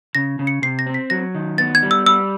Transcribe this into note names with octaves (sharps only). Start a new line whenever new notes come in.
C#3 A#6
C#3
C#7
C3 C7
A#6
C4
B6
F#3 A#6
D#3
B3 A6
G#6
G3
E6
G3 E6